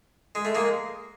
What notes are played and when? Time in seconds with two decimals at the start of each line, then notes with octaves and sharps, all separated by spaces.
0.35 G#3
0.45 A3
0.55 G#3 A#3